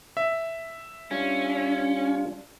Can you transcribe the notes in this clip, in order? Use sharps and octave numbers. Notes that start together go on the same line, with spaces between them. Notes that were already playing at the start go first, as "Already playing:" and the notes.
E5
G3 C#4 D4 F4